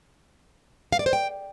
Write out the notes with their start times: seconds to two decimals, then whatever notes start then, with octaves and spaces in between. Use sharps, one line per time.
0.92 F5
0.99 D5
1.06 C5
1.13 G5